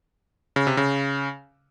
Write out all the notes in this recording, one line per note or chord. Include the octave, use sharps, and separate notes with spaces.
C#3
C3
C#3